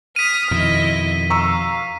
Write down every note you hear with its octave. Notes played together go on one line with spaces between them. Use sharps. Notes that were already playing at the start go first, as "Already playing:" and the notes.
D#6 F6 B6 D#7
F2 B2 D#3 E4 D#5
F5 A#5 C#6 E6